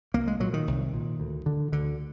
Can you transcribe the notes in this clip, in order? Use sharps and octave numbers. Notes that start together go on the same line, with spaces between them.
C2 A#3
G#3
A#2 F#3
D#3
C2
A#2
D2
D3
D2 D3